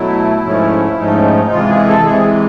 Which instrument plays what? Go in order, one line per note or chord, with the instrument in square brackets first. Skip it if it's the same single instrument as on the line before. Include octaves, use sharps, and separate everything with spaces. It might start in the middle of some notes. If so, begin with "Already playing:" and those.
Already playing: [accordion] B2 F#3 A3 E4
G#2 F3 A3 C#4
G#2 F3 A3 C#4 D#4
C3 E3 G#3 F4
G#4
A4
C3 E3 G#3 G#4